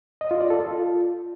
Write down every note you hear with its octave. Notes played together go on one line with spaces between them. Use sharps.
D#5
F4
D5
A4
F4